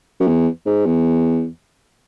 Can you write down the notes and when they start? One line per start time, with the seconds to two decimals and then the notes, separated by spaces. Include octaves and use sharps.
0.20 F#2
0.27 E2
0.66 G#2
0.86 E2